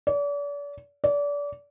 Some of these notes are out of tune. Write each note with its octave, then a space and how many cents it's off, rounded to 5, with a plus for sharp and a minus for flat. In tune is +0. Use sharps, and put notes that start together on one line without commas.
D5 -40
D5 -30